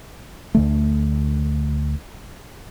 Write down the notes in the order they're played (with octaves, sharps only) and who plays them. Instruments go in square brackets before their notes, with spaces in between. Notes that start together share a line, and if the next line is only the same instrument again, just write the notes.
[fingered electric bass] D2 D3 A3